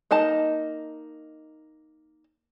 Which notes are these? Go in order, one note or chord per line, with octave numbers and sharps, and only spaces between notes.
A#3 D#4 D#5 A5